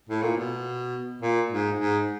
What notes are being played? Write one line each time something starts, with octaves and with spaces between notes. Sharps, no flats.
A2
A#2
B2
A#2
G#2
G#2